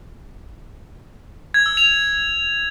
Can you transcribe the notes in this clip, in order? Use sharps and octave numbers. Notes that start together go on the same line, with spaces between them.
G#6
E6
F7